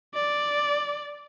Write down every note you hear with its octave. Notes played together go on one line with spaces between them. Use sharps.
D5